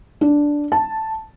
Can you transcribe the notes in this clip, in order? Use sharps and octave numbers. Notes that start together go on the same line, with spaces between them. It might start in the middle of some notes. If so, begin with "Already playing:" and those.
D4
A5